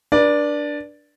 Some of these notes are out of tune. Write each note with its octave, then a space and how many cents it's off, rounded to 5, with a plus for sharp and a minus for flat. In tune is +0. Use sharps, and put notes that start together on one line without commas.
D4 +0 B4 -40 D5 +0